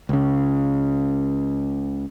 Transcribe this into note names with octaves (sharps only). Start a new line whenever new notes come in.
C#2 C#3